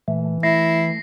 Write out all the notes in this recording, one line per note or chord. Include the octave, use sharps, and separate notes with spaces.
A#2 E3 A3
A3 E4 A#6 C7